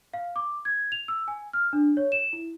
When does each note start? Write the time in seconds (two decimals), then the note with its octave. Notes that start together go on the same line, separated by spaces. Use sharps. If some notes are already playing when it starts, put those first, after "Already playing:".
0.14 F5
0.36 D6
0.65 G#6
0.92 F7
1.08 E6
1.28 G#5
1.53 F6
1.73 D4
1.97 C#5
2.12 E7
2.33 E4